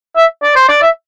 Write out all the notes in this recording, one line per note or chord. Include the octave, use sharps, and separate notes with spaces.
E5
D5
C5
D5
E5